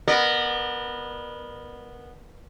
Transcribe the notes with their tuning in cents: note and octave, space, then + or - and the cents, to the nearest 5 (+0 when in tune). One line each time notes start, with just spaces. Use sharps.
B3 -10 A#4 +5 D5 +45